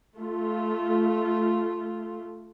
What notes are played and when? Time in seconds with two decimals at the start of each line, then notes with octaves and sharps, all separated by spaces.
0.16 A3 F4